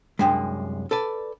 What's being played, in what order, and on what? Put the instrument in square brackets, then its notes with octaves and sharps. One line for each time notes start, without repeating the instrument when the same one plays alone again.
[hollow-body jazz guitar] C2 F#2 G#3 [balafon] D4 G5
[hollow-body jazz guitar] A4 B4 D5